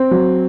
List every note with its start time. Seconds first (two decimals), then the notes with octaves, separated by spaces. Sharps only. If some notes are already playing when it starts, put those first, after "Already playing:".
Already playing: C4
0.11 F#3